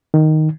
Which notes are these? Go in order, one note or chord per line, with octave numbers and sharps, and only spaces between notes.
D#3